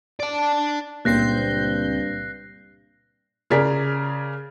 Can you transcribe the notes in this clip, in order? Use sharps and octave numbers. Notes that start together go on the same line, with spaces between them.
D5 A5
C#2 G2 A#2 C4 F#6 G6 A#6 C7
C#3 G#4 A#4 D5 B6